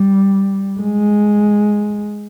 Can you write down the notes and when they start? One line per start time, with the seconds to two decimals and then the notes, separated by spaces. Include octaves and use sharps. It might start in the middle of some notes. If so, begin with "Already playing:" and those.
Already playing: G3
0.80 G#3